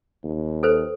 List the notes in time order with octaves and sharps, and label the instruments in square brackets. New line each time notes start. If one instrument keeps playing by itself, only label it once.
[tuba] D#2
[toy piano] A4 B4 C5